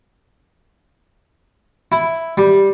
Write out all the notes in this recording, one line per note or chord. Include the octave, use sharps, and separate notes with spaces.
E4
G3